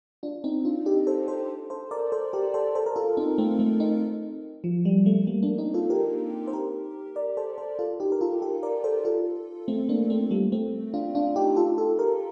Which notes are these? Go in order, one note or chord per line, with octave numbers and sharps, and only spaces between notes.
D4 F4
C4 D#4
D4 F4
D#4 G4
A4 C5
A4 C5
A4 C5
A#4 D5
A4 C5
G4 A#4
A4 C5
A4 C5
A#4
F4 A4
C4 D#4
A3 C4
A3 C4
C4 D#4
F3
G3
F3 A3
G3 A#3
A#3 D4
C4 D#4
F4 A4
G4 A#4
C5
G4 A#4
A#4 D5
A4 C5
A4 C5
F4 A4
D#4 G4
A#4
F4 A4
G4 A#4
A#4 D5
A4 C5
F4 A4
A3 C4
A#3 D4
A3 C4
G3 A#3
A3 C4
D4 F4
D4 F4
D#4 G4
F4 A4
F4 A4
G4 A#4